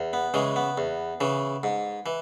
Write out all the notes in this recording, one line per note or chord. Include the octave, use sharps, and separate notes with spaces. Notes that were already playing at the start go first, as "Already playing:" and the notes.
Already playing: E2
B3
C#3 E3 G#3
B3
E2
C#3 E3
G#2
E3